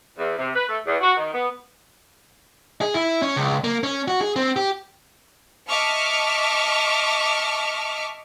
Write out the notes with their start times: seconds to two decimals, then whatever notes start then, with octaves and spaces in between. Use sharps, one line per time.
0.18 E2
0.38 C3
0.55 B4
0.68 A3
0.85 E2
1.01 F#4
1.17 D#3
1.34 B3
2.81 G#4
2.94 E4
3.22 C#4
3.36 C#2
3.64 A#3
3.83 C#4
4.08 F#4
4.21 G#4
4.36 C4
4.56 G4
5.69 D#5 E5 A5 C#6 D6 F6